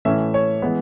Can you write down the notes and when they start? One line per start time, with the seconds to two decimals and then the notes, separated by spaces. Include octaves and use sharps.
0.05 A2 E3 A3 C#4 E5
0.34 C#5
0.62 E3 G#3 B3